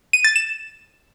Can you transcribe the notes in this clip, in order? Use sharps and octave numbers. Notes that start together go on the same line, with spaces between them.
D#7
A6
E7